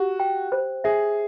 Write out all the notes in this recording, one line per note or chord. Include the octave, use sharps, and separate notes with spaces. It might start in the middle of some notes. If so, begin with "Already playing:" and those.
Already playing: F#4 G4
G5
C5
G#4 E5